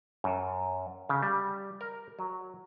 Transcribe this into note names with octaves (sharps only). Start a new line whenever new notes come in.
F#2
C#3
G3
A#4
F#3